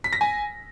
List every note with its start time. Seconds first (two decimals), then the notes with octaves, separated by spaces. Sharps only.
0.04 B6
0.13 A#6
0.21 G#5